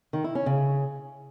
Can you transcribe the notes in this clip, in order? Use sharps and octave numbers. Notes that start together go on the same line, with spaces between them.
D#3
E4
C#4
C#3